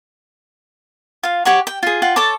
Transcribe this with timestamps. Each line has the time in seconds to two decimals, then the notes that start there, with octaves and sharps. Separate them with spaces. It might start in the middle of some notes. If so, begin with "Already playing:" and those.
1.23 F4 F5
1.45 G4 C#5 F#5 C#6
1.67 G5
1.83 F4 G#4
2.02 F4 F#5 G5
2.16 A4 C#5 A5 D6